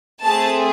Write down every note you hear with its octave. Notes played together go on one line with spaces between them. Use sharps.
A3 C4 G#4 A5